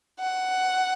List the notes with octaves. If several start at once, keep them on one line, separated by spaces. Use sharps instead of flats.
F#5